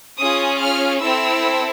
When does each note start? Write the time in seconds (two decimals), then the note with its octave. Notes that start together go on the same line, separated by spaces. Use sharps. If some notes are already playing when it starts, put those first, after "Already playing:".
0.19 C#4 F4 G#4 D#6
0.61 F6
1.01 C4 E4 A4 E6